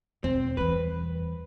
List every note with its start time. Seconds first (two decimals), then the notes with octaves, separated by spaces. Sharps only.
0.24 B1 E2 C4
0.57 E3 G3 B4